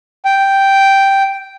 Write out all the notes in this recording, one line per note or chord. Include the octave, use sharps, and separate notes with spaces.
G5